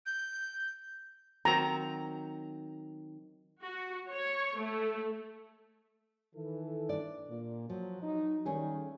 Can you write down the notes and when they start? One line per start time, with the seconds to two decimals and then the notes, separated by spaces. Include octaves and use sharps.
0.06 G6
1.45 D#3 F#3 C4 A#5
3.62 F#4
4.10 C#5
4.59 A3
6.34 D#3 E3 A4
6.89 D4 D5
7.29 A#2
7.70 F3 F#3
8.02 F#3 D#4
8.46 D#3 G3 A3 C#4 G#4